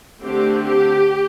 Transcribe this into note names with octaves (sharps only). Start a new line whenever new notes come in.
D3 A3 C4 G4
G4